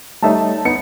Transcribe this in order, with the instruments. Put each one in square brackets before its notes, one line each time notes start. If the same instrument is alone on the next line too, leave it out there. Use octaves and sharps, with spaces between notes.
[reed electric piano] G3 A3 D#4 [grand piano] C#5 E5 A5
[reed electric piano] B3 D#4 [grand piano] C#7